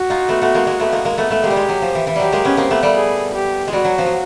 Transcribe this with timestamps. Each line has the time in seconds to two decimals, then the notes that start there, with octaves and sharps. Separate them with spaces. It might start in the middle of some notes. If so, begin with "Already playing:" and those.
Already playing: F#4
0.10 D#4 F4
0.28 A3 B3
0.42 A3 B3
0.55 G#3 A#3
0.66 G#3 A#3
0.79 A3 B3
0.92 G#3 A#3
1.05 G#3 A#3
1.17 A3 B3
1.30 A3 B3
1.43 G#3 A#3 G4
1.50 G3
1.56 G#3
1.69 F#3
1.82 F3
1.95 E3
2.07 E3
2.16 F#3 G3 G4
2.32 G#3 A#3
2.45 B3 C#4
2.57 A#3 C4
2.71 A3 B3
2.83 G3 A3
2.96 G#4
3.35 G4
3.68 G#3
3.73 G3 F#4
3.85 F#3
3.98 F3
4.06 F#3